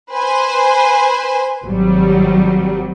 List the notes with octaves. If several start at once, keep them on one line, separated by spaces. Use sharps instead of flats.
B4 C5 G#5
G#1 F#3 G3